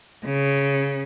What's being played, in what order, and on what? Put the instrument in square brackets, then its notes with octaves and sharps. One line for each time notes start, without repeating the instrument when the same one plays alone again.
[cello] C#3